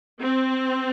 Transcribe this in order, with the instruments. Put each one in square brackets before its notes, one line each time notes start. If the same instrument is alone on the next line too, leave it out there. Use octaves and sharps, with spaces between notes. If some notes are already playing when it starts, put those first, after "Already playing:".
[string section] C4